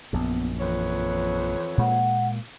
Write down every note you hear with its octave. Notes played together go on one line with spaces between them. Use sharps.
A#1 F#2 B3
F2 E3 B4 C#5
A#2 G#3 A#3 F#5